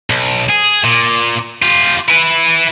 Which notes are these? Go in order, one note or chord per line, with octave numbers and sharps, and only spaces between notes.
B1
G#4
A#2
F4 G4
E4 B4